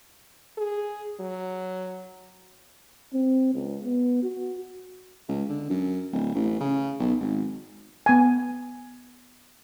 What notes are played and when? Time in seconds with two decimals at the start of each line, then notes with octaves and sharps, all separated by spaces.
0.57 G#4
1.20 F#3
3.13 C4
3.54 C#2
3.84 B3
4.23 F#4
5.28 C#2
5.49 D3
5.70 F#2
6.12 D1
6.34 A1
6.60 C#3
6.99 B1
7.20 G#1
8.06 B3 G#5